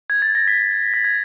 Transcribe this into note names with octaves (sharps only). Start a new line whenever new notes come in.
G#6
A6
A#6
B6
A6
G#6